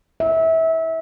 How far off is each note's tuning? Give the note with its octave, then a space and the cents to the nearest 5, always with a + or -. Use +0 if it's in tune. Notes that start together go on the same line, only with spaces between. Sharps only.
E5 -25